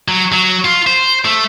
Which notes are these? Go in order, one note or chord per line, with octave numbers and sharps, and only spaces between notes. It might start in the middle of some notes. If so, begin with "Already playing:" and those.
F#3
F#3
F4
C5
A3